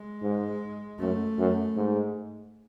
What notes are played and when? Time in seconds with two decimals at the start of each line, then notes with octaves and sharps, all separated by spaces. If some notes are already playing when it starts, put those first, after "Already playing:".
Already playing: G#3
0.22 G#2
0.99 F#2 A3
1.38 F#2
1.76 G#2